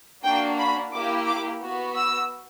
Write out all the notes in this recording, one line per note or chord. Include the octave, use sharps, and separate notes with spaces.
A#3 D4 F#4 G5
B5
A#3 E4 G4 D6
D6
B3 F#4
E6